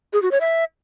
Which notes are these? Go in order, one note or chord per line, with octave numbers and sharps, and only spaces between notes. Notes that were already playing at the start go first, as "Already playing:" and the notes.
G#4
F#4
C#5
E5